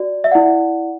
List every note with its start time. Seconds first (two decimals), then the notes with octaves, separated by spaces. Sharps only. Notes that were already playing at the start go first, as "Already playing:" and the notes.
Already playing: F#4 D5
0.24 E5
0.31 E4 D5 F#5